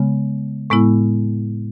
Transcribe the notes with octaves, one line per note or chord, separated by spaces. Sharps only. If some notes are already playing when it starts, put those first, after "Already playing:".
Already playing: C#3 G#3 B3
A2 G#3 B3 E4